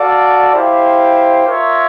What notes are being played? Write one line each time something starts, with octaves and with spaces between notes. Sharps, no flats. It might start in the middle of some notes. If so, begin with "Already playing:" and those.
Already playing: F#4 A4 D5 F5
E4 G4 C5 F5
F4 A#4 C#5 E5